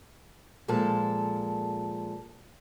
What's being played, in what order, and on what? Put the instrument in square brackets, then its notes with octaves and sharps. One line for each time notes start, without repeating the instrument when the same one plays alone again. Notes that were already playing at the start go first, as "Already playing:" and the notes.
[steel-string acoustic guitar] A#2 F3 G#3 A4 A5